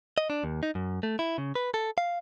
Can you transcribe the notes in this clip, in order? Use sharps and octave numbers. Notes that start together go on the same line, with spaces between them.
D#5
D4
D#2
D#4
F#2
A3
E4
C#3
B4
A4
F5